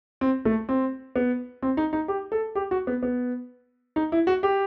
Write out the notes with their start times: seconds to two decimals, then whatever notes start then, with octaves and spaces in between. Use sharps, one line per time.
0.21 C4
0.45 A3
0.69 C4
1.16 B3
1.62 C4
1.77 D#4
1.93 D#4
2.08 G4
2.32 A4
2.55 G4
2.71 F#4
2.87 B3
3.03 B3
3.96 D#4
4.12 E4
4.27 F#4
4.43 G4